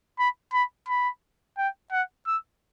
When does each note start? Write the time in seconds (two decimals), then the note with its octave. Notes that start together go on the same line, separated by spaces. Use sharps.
0.19 B5
0.53 B5
0.88 B5
1.58 G5
1.91 F#5
2.26 E6